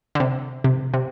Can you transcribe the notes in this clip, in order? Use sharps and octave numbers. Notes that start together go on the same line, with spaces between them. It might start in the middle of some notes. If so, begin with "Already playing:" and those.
D3
C3
C3
C3